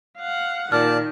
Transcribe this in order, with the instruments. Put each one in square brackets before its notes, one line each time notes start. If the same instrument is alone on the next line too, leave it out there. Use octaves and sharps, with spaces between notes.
[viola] F5 F#5
[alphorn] A#2 [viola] D#3 [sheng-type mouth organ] D5 A5 [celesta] F6